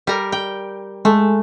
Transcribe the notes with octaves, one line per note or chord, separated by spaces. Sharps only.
G3 A#4
G5
G#3 A3